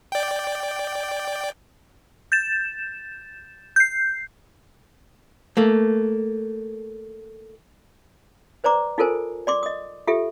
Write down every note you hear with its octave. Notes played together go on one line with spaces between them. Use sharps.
D5 G5
G6 A6 E7
G6 C7
A3 A#3
B4 C5 D5 A#5 D6
D#4 F4 A4 A#4 C5 G#5
D5 C6 D6
D#5 D#6
F4 G4 A4 E5